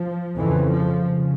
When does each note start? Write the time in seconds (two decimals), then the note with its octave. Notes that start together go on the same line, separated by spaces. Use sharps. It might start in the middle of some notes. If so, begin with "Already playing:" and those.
Already playing: F3
0.38 F2 C#3 E3
0.71 F3
1.06 C#3